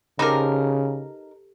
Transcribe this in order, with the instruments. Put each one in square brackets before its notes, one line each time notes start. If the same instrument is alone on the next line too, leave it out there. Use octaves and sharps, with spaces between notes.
[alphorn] C#3 [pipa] D#4 A#4 [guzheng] G4 A4 C5